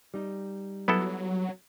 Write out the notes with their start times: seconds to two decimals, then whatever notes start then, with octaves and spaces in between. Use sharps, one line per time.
0.14 G3 D#4
0.88 F#3 B3 E4 A4